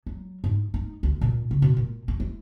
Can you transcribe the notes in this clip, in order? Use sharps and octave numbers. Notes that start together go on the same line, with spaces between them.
F#3
G#2
D#4
D2
A#2
C#3
B2
A#2
C#4
E4